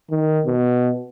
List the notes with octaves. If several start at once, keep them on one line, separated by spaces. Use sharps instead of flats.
D#3
B2